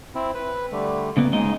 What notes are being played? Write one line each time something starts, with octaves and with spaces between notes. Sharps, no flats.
C4 E4
B4
D3 G3 A3
C#3 A#3 B3
G#2 C#3 G#3 D#4 D#5